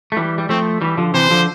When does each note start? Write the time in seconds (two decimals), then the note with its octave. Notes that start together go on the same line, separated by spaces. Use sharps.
0.12 A3
0.17 E3 G3
0.38 G3
0.49 F3 A3 C4
0.81 E3 G3
0.97 D3 F3
1.14 C3 E3 C5
1.30 D3 F3